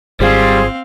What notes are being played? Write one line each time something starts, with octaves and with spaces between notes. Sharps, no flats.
G#1 G3 C4 F4 G#4 C5 F5